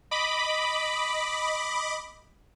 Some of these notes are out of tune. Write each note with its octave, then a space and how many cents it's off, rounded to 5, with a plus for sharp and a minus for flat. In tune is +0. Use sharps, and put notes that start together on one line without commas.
D#5 +0 B5 +0 D6 +0